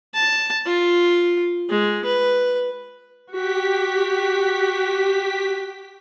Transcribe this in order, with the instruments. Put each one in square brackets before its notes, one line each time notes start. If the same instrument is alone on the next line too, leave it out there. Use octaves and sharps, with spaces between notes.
[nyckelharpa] A5
F4
G#3
B4
[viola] F#4 [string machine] G4 B6